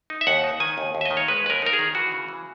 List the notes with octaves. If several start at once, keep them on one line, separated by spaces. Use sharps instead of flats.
D#4
E5
D#2 F#5
D#4
D#3 G#5
D#2
D#2
E5
D#5
D#3
C#5
G#3 B4
D#2 B4
A#4
D#4 A#4
G#4
D#3
E3 F#4
C#3
E3